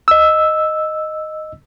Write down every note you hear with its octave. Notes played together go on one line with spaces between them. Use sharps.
D#5 E6